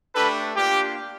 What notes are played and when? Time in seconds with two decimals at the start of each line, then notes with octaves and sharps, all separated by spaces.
0.14 A3 D4 G4 A4 B4
0.56 A#3 D4 F4 G4